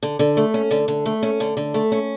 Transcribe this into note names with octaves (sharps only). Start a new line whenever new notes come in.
D3
D3
A3
C#4
D3
D3
A3
C#4
D3
D3
A3
C#4